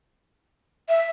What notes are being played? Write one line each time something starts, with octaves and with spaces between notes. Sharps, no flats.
E5